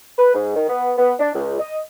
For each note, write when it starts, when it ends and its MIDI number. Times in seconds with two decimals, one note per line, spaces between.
0.18 0.33 71
0.34 0.52 44
0.55 0.67 51
0.69 0.92 59
0.97 1.13 59
1.19 1.30 62
1.34 1.56 37
1.59 1.78 75